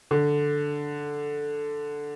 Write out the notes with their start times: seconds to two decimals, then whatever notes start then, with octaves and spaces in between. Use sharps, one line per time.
0.11 D3